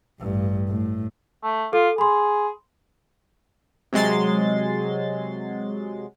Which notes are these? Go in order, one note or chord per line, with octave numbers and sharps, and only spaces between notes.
A1 G2
A2
A3
F4 A4
G#4 B5 C6
C3 F#3 G#3 C6 A6